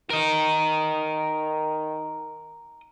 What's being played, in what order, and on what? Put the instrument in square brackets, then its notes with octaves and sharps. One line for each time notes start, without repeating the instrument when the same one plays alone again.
[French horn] D#3 [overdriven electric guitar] A#4 D#5